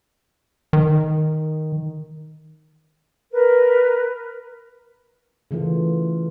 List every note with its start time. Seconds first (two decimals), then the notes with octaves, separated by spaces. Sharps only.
0.73 D#3
3.32 A#4 B4
5.51 C#3 E3 A3 F4